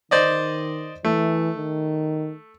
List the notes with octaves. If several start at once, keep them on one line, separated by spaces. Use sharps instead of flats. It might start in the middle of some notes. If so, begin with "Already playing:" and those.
D#3 C5 D5 D#5
E3 A3
D#3